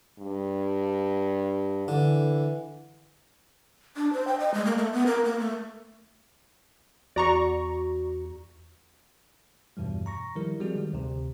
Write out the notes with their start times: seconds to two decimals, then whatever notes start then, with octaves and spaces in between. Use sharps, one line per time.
0.19 G2
1.88 D3 E3
3.96 D4
4.13 C5
4.28 G5
4.40 D#5
4.54 G#3
4.65 A#3
4.78 A3
4.93 B3
5.06 A#4
5.25 A#3
5.40 A3
7.16 E2 F#4 D5 A#5 C#6
9.77 E2 G2 B2 E3 G3
10.06 A#5 C#6 A#6
10.35 D#3 F3 G3 E4 A#4
10.60 F3 G3 G#3 C4 F#4 G#4
10.75 D#3 G3
10.93 D2 C3